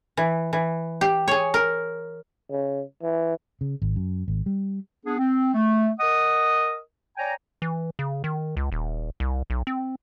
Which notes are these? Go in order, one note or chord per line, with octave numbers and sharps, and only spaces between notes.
E3
E3
G4
G#4 C#5
A#4
C#3
E3
C#3
G#1
F#2
G#1
G3
B3 D4 G#4
C4
A3
A#4 D#5 F#5 D#6
C#5 D5 G5 G#5 A#5
E3
C#3
D#3
C#2
D#1
C2
B1
C4